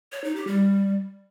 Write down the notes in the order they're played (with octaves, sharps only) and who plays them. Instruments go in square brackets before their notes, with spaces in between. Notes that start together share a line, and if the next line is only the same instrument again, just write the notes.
[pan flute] C#5
D#4
G4
G3